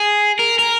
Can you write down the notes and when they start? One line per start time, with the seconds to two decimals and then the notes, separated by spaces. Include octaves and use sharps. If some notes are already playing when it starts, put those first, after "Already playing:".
Already playing: G#4
0.39 A#4
0.59 A#4